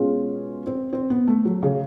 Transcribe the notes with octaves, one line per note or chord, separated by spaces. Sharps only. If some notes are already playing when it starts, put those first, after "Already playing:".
Already playing: B2 G#3 C#4 F4 G#4
C4
C4
B3
A3
F#3
C#3